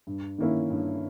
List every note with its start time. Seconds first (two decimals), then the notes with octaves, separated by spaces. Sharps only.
0.07 G2
0.38 D#3 A#3 C#4 E4
0.70 G2